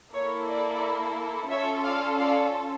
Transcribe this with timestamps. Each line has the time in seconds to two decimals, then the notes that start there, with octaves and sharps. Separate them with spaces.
0.14 A#3 E4 A4 C#5
0.47 D5
1.50 C#4 F4 A4 C#5 E5
1.84 D5 F5
2.18 D5 F5